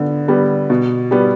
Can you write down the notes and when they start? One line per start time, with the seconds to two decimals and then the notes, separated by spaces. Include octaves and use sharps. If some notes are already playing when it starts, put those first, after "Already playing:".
Already playing: D3 B3
0.28 G3 B3
0.70 B2
1.11 G3 B3